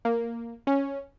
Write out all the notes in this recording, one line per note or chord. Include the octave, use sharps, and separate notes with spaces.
A#3
C#4